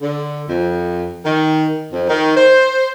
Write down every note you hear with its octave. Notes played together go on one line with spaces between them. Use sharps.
D3
F2
D#3
F2
D#3
C5